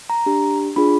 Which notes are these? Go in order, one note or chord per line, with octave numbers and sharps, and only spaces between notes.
A#5
D4 G4
D4 F4 G#4 B5